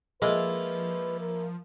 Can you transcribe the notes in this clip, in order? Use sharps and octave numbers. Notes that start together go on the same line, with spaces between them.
F3 G#3 A#3 E4 F4 B4
A#4